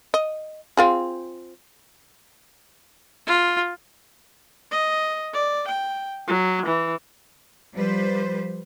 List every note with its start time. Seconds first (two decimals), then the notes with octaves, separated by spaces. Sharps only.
0.14 D#5
0.77 C4 F4 G#4
3.27 F4
4.71 D#5
5.34 D5
5.68 G5
6.28 F#3
6.66 E3
7.73 F3 G3 B4 C5